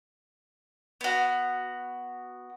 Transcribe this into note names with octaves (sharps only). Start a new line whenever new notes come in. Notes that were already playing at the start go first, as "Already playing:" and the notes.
B3 F#4